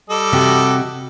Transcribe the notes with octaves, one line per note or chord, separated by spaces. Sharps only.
G3 A4 D#5
C3 F#4 G4